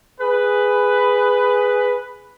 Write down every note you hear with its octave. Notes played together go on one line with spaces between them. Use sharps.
G#4 B4